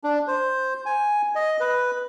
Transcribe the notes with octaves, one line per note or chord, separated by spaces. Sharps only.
D4
C5
G#5
D#5
B4